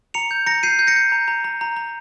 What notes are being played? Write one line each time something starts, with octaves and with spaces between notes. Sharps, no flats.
A#5 C#7 F7
G6
A#5 A#6 C#7
G6 C7 D#7
G6
A#6 C#7
G6
A#5
A#5
A#5
A#5
A#5